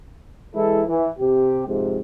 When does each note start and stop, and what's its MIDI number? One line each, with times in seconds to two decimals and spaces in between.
0.55 0.82 52
0.55 0.82 56
0.55 0.82 64
0.55 0.82 69
0.88 1.09 52
1.19 1.67 48
1.19 1.67 67
1.67 1.99 41
1.67 1.99 44
1.67 1.99 48